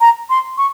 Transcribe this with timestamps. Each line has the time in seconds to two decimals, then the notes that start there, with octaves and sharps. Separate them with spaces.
0.01 A#5
0.30 C6
0.58 C#6